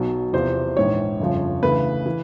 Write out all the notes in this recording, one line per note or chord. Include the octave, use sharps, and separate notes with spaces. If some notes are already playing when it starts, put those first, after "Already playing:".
Already playing: B1 B2 F#3
E2 C3 F3 C5
A#1 G#2 E3 C#5
G1 F2 C#3 F3
D2 C#3 E3 B4
E3